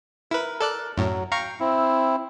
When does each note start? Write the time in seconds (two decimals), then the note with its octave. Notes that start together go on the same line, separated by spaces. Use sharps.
0.31 E4 A#4 B4
0.61 A4 D5 F#6
0.98 F#2 A2 F#3
1.32 F5 G5 A#5 C#6
1.60 C4 E4